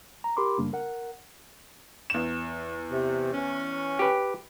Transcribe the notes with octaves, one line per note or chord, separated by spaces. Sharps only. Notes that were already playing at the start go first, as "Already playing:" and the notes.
A#5
G4 A#4 B5 C6 D6
F#2 C#3 G3 A#3 D4
A#4 F#5
E2 E7
C3
C#4
G4 B4